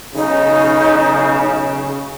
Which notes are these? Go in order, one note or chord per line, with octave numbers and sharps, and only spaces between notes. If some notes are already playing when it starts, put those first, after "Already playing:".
B1 C#3 D#4